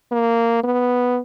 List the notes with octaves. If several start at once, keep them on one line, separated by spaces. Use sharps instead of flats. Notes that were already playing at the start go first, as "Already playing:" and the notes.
A#3
B3